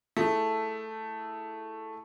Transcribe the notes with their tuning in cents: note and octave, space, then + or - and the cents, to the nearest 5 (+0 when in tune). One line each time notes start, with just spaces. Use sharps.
A3 +0 E4 +0 G#4 +0